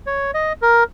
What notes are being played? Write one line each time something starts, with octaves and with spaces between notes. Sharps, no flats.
C#5
D#5
A#4